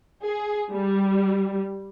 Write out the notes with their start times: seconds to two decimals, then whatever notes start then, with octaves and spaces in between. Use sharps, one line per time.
0.24 G#4
0.72 G3